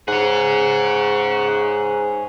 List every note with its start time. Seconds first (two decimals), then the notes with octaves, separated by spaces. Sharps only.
0.08 G#2 G#4 C#5 F#5